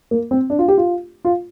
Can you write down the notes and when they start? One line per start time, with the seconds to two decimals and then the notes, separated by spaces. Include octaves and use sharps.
0.11 A#3
0.31 C4
0.50 D4
0.59 F4
0.68 G4
0.78 F4
1.25 F4